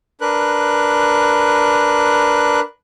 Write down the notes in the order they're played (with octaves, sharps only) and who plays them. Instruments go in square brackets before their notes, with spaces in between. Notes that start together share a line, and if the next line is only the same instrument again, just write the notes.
[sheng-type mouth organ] D4 A#4 B4 F#6